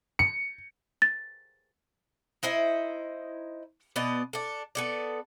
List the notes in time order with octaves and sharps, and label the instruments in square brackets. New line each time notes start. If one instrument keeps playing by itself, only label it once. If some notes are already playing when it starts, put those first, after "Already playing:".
[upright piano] C#7
[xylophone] A6
[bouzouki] D#4 E4 C5 D#5
B2 B3 D5 D#5
D4 A4
B3 A4 D5